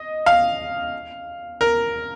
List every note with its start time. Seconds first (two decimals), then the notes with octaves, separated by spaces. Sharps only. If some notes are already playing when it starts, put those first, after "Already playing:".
Already playing: D#5
0.26 F5
1.61 A#4